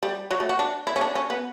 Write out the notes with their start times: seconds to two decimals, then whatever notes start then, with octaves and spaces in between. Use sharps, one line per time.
0.03 G3
0.31 F#3
0.40 A3
0.49 F#4
0.59 D4
0.87 E4
0.96 C#4
1.01 D4
1.15 C#4
1.30 B3